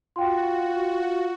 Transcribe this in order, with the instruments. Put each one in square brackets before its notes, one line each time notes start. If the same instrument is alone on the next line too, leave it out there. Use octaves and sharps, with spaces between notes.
[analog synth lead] F4 [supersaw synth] F#4 [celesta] G5 C6